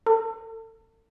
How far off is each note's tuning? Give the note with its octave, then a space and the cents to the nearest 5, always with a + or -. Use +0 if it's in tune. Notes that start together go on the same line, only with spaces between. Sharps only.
A4 +35